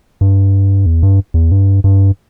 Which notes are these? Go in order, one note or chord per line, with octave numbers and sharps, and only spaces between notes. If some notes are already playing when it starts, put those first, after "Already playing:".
G2
E2
G2
E2
G2
G2